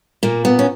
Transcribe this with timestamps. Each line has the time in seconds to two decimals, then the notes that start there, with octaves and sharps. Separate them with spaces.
0.23 A#2 A#3
0.45 B3
0.59 C#4